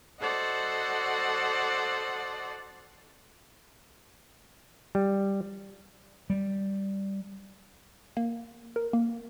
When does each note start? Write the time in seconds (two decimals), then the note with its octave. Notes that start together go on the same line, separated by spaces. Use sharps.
0.20 F#4 A4 C5 D5 D#5 F#5
4.95 G3
6.30 G3
8.17 A#3
8.76 A#4
8.93 A#3